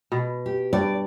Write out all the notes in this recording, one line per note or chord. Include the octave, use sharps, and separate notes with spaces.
B2
G4
G2 D5